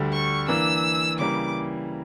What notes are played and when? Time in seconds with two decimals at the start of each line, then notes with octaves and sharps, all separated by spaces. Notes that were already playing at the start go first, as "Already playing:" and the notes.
Already playing: D2 D3 G3
0.12 C#6
0.48 E3 A#3 D4 E6
1.18 C#3 E3 G3 A#3 D6